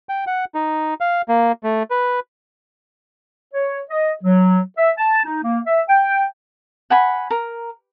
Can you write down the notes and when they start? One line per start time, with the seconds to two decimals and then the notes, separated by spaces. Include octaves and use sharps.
0.09 G5
0.27 F#5
0.55 D#4
1.01 F5
1.28 A#3
1.63 A3
1.90 B4
3.54 C#5
3.90 D#5
4.24 F#3
4.78 E5
4.97 A5
5.25 D#4
5.43 A#3
5.66 E5
5.89 G5
6.90 F#5 G#5 B5
7.31 A#4